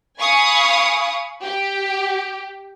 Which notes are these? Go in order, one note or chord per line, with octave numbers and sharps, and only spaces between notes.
F5 G#5 B5 C#6 D#6
G4